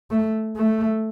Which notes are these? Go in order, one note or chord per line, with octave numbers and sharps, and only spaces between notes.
A3
A3